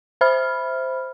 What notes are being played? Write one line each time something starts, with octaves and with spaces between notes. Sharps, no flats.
C5 E5 B5 F6